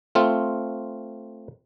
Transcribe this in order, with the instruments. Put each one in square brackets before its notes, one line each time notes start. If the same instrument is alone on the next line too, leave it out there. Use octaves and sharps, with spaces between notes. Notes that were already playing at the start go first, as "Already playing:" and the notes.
[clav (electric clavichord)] A3 C4 F4